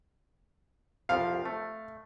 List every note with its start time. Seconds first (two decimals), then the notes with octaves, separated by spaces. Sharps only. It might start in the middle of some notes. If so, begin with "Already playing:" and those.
1.09 C2 F2 F3 F5
1.45 A3